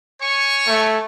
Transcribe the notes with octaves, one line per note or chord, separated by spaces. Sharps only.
C#5 G#5 C#6
A3